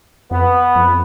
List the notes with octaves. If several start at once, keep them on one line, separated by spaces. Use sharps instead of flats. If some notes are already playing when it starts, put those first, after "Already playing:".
F2 B3
F2